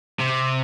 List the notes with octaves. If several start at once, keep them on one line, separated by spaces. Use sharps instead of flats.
C3